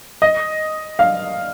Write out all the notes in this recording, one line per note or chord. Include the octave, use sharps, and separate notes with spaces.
D#5
F5